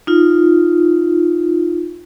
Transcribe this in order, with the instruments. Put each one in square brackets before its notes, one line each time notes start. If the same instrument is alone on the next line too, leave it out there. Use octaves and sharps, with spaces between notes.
[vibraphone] D#4 F4